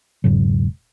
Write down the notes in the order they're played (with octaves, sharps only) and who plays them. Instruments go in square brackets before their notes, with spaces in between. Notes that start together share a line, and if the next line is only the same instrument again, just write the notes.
[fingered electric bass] E1 G#2 C#3 F#3